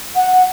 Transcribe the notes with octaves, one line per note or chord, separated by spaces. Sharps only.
F#5